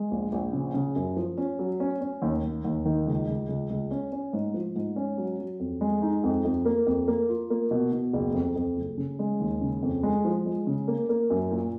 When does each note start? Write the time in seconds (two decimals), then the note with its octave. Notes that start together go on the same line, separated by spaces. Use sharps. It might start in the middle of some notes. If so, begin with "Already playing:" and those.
Already playing: G#3
0.11 A#1
0.32 A#1
0.53 C#3
0.74 C#3
0.96 F#2
1.17 F3
1.38 C#4
1.59 F#3
1.80 C#4
2.01 C#4
2.22 D#2
2.43 D#2
2.65 D#2
2.85 D#3
3.06 C#2
3.28 C#2
3.49 C#2
3.70 C#2
3.91 C#4
4.12 C#4
4.33 G#2
4.54 F3
4.76 G#2
4.96 C#4
5.18 F#3
5.39 F#3
5.60 F2
5.81 G#3
6.02 D#4
6.24 F2
6.44 F2
6.65 A#3
6.86 F2
7.08 A#3
7.29 F4
7.50 A#3
7.71 B2
7.92 B2
8.13 F#1
8.34 F2
8.56 F2
8.77 F#1
8.98 C#3
9.19 G#3
9.40 D#2
9.61 C#3
9.82 F2
10.03 G#3
10.25 F3
10.46 G#3
10.67 C#3
10.88 A#3
11.09 A#3
11.30 F#2
11.51 A#2